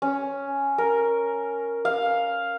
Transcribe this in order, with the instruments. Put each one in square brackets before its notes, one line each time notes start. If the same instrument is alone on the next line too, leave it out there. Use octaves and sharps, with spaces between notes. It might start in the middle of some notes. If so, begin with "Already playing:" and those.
[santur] C#4
A#4
F5